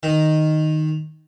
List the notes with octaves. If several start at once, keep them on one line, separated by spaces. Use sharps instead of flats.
D#3